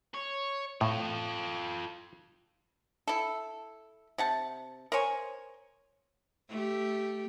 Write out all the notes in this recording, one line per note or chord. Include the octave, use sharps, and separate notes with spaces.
C#5
A2 F4 A4
E4 A4
C3 F#5 A5
A#4 C5 C#5 G#5
A3 G4